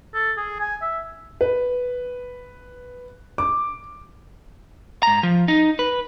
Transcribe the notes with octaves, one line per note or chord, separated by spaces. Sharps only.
A4
G#4
G#5
E5
B4
D6
G#2 A#5
F3
D#4
B4